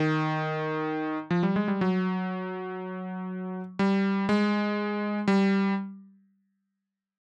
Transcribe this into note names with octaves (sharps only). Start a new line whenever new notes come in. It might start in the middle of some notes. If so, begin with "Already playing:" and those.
Already playing: D#3
F3
G3
G#3
G3
F#3
G3
G#3
G3